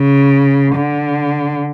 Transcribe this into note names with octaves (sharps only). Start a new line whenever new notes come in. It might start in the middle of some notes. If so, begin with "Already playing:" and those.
Already playing: C#3
D3